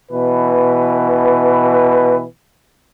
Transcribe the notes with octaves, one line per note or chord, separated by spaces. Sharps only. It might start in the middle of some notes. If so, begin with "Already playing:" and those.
B2 E3 B4